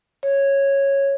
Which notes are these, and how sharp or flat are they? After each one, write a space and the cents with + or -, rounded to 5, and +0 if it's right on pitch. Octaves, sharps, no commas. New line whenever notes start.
C#5 -5